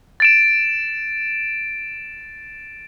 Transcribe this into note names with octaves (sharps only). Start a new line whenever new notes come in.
A6 D7 E7